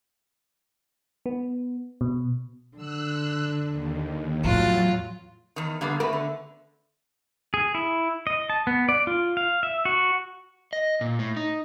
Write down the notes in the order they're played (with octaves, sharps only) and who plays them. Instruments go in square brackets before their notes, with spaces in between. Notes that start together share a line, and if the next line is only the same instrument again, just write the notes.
[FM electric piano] B3
B2
[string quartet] D3 [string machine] E6 F#6
[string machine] D#2
[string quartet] E2 F#6 A6 [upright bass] A2 F3 [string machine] F#3 [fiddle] F4
[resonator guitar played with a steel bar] E2 D#3
[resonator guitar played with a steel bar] D3 G3 [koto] A#3 B3 F5
[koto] A3 F#4 [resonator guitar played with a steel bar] A#4 B4
[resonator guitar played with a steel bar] D3
[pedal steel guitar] G#4
E4
D#5
A5
B3
D5
F4
F5
E5
F#4
[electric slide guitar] D#5
A#2
A2
D#4